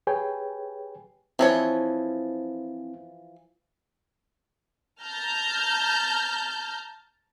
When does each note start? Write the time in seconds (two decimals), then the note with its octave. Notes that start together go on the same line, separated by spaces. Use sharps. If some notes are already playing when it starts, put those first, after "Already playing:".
0.07 G4 G#4 B4 C#5 G5 G#5
1.39 E3 F3 C4 E4 C#5
5.02 A5 A#5 F6 G6